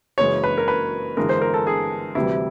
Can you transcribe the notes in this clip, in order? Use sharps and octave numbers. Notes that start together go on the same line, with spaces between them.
F#1 F#2 C#3 E3 G#3 C#5
B4
A#4
B4
G1 G2 E3 G#3 A#4
C5
A#4
A4
G#4
D2 C3 E3 G3 E4